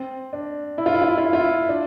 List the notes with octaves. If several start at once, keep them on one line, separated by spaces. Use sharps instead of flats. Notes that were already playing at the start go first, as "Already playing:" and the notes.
Already playing: C4
D4
E4
F4
E4
F4
E4
F4
E4
F4
E4
D4